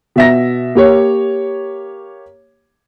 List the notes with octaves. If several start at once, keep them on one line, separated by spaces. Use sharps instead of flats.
B2 E5 A#6
A#3 G4 C#5